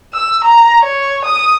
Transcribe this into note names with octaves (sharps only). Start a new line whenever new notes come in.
E6
A#5
C#5
D#6